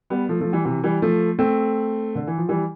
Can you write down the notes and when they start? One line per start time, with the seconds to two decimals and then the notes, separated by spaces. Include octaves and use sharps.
0.10 G3 B3
0.29 F3 A3
0.40 F3 A3
0.53 E3 G3
0.65 C3 E3
0.83 E3 G3
1.02 F3 A3
1.39 A3 C4
2.15 D3
2.27 E3
2.38 F3
2.49 E3 G3